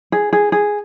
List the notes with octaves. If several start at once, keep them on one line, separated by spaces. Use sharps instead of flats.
G#4
G#4
G#4